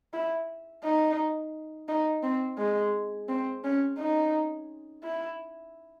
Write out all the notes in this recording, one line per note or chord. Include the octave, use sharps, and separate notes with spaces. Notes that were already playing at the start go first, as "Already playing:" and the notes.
E4
D#4
D#4
C4
G#3
C4
C#4
D#4
E4